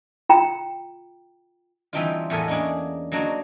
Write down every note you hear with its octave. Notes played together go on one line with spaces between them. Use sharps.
F4 G5 A#5
E3 G3 C4 D4 D#4 F4
E2 A2 B3 A4 A#4 G#5
G#3 A#3 C#4 D4 G#4
F#3 A#3 D4 D#4 F#4